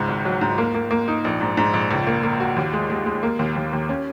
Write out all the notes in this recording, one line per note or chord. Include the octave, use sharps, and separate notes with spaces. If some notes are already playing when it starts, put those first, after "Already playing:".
Already playing: C#2 G#2
G#1
F#3
G#2
A#3
A#3
A#3
D#4
A#1
G#2
G#2
A#1
C#2
A#3
A#3
F#4
D#2
G#3
G#3
G#3
A#3
D#2
D#2
D#2
C#4